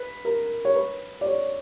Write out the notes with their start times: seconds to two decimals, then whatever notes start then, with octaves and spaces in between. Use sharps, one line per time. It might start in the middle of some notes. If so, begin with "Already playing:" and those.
Already playing: B4
0.25 A#4
0.65 C#5
0.76 B4
1.21 D5
1.26 C#5